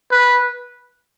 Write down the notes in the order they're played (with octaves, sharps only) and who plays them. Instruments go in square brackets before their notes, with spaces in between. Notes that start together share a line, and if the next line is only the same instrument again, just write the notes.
[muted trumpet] B4